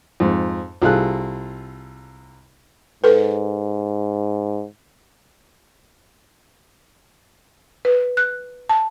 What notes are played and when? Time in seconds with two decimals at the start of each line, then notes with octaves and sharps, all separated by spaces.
0.20 F2 G#2
0.82 C2 F4 G#4 A4 F#6
3.04 G#2 A4 B4
7.85 B4
8.17 F#6
8.69 A5